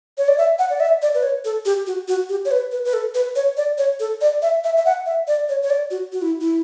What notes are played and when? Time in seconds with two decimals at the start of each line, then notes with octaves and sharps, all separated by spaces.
0.18 C#5
0.28 D5
0.38 E5
0.59 F#5
0.70 D5
0.80 E5
1.02 D5
1.14 B4
1.23 C#5
1.45 A4
1.65 G4
1.87 F#4
2.08 F#4
2.29 G4
2.45 C#5
2.51 B4
2.72 B4
2.85 B4
2.93 A4
3.15 B4
3.36 C#5
3.57 D5
3.78 C#5
4.00 A4
4.21 D5
4.42 E5
4.64 E5
4.77 E5
4.85 F#5
5.06 E5
5.28 D5
5.49 C#5
5.63 C#5
5.70 D5
5.91 F#4
6.13 F#4
6.22 E4
6.40 E4